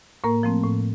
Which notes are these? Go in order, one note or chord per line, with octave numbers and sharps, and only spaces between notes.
A2 A#3 A#4
F3 A3 C4
A2